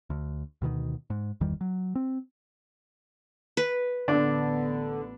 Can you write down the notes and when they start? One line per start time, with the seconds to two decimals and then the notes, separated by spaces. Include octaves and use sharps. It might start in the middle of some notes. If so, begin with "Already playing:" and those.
0.10 D2
0.62 D2 B2 D3 D#3
1.10 G#2
1.41 G1 E2 D#3 G3
1.61 F#3
1.95 C4
3.57 B4
4.08 A1 D3 B3 D4